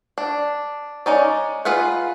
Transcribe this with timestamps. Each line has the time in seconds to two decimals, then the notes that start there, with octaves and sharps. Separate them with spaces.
0.18 D4
1.06 G#3 C#4 D#4 D5
1.65 F4 G#4 B4 F5 F#5